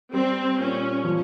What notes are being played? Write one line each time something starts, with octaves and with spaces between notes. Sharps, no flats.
G3 C4
A#2 C#4
F3